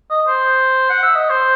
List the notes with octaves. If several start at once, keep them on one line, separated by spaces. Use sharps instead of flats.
D#5
C5
F#5
E5
D#5
C5